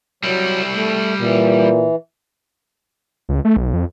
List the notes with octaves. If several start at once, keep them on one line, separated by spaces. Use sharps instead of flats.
F#3 G3 E4
A3
A#2 E3
C#2
A3
B1
F2